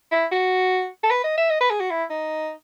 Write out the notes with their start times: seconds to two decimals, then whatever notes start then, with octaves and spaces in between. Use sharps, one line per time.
0.12 E4
0.32 F#4
1.04 A4
1.11 B4
1.24 D#5
1.37 E5
1.50 D#5
1.61 B4
1.71 G#4
1.80 F#4
1.90 E4
2.10 D#4